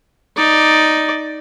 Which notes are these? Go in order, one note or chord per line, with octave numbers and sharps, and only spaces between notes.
D#4 D5